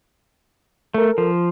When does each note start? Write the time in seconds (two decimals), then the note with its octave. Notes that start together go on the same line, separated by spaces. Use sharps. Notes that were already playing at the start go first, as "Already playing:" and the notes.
0.94 A3 A4 A#4
1.18 F3